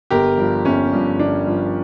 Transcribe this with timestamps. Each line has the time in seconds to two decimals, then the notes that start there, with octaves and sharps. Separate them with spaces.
0.11 G1 G4 A#4
0.38 G2 F3
0.65 G1 C#4
0.93 G2 F3
1.19 G1 D4
1.46 G2 F3